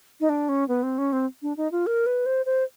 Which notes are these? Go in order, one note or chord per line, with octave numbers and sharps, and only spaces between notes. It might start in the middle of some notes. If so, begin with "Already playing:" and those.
D#4
D4
C#4
B3
C4
C#4
C4
D4
D#4
F4
A#4
B4
C5
C5